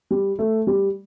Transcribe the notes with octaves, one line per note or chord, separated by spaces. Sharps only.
G3
A3
G3